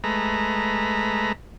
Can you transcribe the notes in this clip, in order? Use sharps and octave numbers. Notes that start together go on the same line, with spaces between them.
G#3 A3 B4 A#5